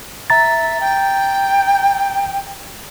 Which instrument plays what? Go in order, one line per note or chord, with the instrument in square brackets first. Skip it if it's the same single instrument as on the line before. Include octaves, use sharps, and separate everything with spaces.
[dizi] E5 [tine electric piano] A#5 A6
[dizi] G5